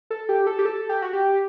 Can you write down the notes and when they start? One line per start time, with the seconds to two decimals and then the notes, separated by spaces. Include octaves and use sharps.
0.10 A4
0.29 G4
0.47 A4
0.59 G4
0.65 A4
0.89 G4
1.02 F#4
1.13 G4